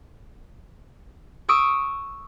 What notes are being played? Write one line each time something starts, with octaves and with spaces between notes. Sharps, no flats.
C#6 D#6 E6 D7